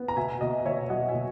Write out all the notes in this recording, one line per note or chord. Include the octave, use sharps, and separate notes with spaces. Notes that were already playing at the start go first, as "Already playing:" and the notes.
Already playing: B3
A#5
B2 E5 G#5
B2 D#5
B2 C#5 E5
F#3 D#5 F#5
E5 G#5
B2